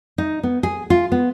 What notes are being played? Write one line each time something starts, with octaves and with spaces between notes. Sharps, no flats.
D#4
B3
G#4
F4
B3